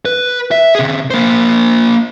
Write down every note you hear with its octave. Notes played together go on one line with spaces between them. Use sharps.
B4
E5
C3 G#4
A#3 C5